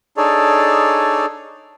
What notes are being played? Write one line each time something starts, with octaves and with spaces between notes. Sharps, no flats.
D4 D#4 G#4 A4 C#5 D5